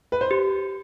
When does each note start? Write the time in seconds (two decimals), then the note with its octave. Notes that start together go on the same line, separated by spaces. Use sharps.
0.12 B4
0.21 C5
0.31 G4